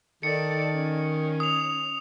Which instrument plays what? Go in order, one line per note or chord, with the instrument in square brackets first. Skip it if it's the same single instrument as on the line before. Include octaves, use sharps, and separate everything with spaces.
[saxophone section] D#3 [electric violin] A4 D5 [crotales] C#7
[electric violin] C#4
[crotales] D#6 F7